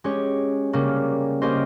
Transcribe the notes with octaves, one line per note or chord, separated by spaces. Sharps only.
G#3 C#4 G4 C#5
C#3 G3 A#3 C#4
A#3 C#4 G4 C5 D#5